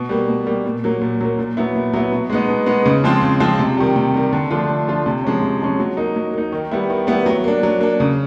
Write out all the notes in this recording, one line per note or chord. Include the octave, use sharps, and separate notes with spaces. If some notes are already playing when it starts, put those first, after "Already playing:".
Already playing: B2
G3 A#3
B2
G3 A#3
A#2
F#3 A#3
A#2
F#3 A#3
A#2
F#3 B3 E4
A#2
F#3 B3 E4
B2
G#3 B3 D#4
B2
G#3 B3 D#4
C#3
F3 G#3 C4 F4
C#3
F3 G#3 C4 F4
C3
D#3 G3
C3
D#3 G3
D3
F3 A3 D4 F4
D3
F3 A3 D4 F4
C3
F3 G#3 C#4
C3
F3 G#3 C#4
F#3
A#3 D#4
F#3
A#3 D#4
D#3
G3 B3 E4
D#3
G3 B3 E4
F#3
A#3 D4
F#3
A#3 D4
C#3